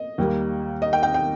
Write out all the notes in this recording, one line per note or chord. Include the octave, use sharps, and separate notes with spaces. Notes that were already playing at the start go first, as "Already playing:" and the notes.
Already playing: D#5
D#2 D#3 G3 A#3
D#5
G5
G5
G5